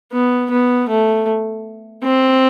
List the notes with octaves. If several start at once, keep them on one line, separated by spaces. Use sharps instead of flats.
B3
B3
A3
C4